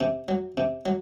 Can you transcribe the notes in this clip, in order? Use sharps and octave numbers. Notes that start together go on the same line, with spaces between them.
C3
F#3
C3
F#3